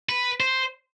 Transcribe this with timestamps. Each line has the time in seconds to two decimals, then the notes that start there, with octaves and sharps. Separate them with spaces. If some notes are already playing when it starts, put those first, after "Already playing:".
0.09 B4
0.40 C5